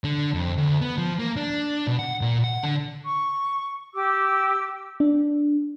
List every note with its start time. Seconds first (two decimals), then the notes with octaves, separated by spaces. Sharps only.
0.04 D3
0.34 F2
0.58 D2
0.81 B3
0.98 F3
1.19 A#3
1.37 D4
1.87 B2
1.99 F#5
2.21 A#2
2.44 F#5
2.63 D3
3.04 C#6
3.93 G4 D6 E6
5.00 D4